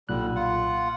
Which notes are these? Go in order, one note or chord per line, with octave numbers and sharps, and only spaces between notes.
B1 A#2 D3 G3 F#6
F4 F#5